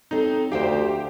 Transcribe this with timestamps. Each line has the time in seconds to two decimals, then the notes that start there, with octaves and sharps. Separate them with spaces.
0.11 C4 D#4 A4 C#5
0.52 D2 G4 C5 F5 G5